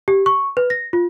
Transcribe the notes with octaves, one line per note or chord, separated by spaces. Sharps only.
G4
C#6
B4
A#6
F4